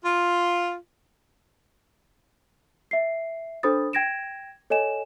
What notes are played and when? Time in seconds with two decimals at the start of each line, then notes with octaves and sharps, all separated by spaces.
0.04 F4
2.91 E5 C7
3.63 D4 A4 C5 B5 D#6 A6
3.93 G5 G#6 A#6 D7 E7
4.70 A4 C#5 D#5 G#5 E7